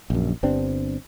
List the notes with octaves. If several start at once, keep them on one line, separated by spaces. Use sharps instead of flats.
A#1 F#2
G1 G2 C4 D4